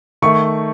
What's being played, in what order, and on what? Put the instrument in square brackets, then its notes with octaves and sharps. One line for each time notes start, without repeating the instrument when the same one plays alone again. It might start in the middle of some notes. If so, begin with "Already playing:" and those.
[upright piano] D#3 A3 C#6